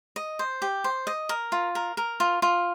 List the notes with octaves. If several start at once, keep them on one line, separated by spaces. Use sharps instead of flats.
D#5
C5
G4
C5
D#5
A#4
F4
A#4
A#4
F4
F4